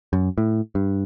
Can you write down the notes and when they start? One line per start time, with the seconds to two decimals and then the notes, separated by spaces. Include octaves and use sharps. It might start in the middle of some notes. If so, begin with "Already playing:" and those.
0.13 F#2
0.38 A2
0.75 G2